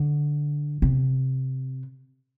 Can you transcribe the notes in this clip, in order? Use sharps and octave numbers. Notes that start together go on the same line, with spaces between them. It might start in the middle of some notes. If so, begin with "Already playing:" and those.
Already playing: D3
C3